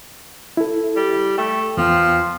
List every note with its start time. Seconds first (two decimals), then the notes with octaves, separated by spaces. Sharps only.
0.57 E4 A4
0.96 G3
1.38 A3 G5
1.77 E2 F3 B3 G5